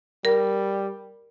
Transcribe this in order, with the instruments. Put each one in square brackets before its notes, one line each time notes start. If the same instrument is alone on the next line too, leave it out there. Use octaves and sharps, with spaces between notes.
[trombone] G3 [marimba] A#4